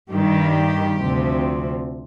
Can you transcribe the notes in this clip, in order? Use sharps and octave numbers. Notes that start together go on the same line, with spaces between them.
G2 D#3 G3 G4
D2 C3 F3